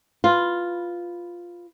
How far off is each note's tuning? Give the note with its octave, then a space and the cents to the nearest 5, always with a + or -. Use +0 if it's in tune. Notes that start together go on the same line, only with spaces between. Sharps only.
F4 +0 B4 +0